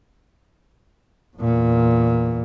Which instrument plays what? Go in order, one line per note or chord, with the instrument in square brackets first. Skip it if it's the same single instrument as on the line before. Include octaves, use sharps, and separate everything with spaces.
[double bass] E2 A#2